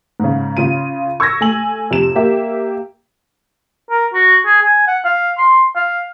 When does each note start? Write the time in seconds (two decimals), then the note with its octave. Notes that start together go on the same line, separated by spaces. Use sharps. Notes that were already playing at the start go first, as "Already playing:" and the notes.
0.20 G#2 C#3
0.57 C#3 F4 D#7
1.20 C#6 E6 G#6 A#6
1.41 A3 G#5 F#7
1.91 F2 C3 E7
2.15 A#3 G4 E5
3.91 A#4
4.14 F#4
4.46 G#4
4.63 G#5
4.87 F#5
5.05 F5
5.38 C6
5.76 F5